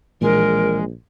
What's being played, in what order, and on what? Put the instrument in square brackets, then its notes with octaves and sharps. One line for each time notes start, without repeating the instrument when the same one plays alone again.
[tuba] A#1 [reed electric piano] A#2 E3 [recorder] G#3 [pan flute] A#4